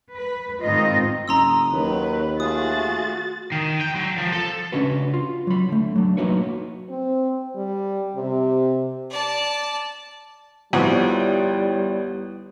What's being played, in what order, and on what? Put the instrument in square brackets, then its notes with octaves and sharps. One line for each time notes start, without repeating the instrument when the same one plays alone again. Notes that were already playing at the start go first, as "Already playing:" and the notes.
[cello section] B4
G#2 D#3 C4 D#4 F4 D#5
[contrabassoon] F#1 [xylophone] A#5 C6 E6 [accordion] D#6
[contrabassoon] D#2 [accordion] D#3 F#3 [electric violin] B4
[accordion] A3 F4 G#4 [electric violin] F#4 A6 [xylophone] D#6
[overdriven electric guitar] D#3
G5
F#3
F3
A4
[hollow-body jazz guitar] C#3 C#4 D4 F#4 B4
F4
F#3 B5
D3 A3
F#3 D4
F#3 A#3 D#4 F#4 B4 C#5
[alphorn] C4
G3
C3
[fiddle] D5 A5
[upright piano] G1 F3 F#4 [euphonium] G3 [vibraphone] E4 C#5 D5